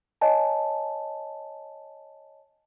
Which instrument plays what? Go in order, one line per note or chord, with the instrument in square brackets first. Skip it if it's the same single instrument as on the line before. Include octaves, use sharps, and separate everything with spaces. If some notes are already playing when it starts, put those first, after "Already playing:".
[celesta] C#5 D#5 G#5 A5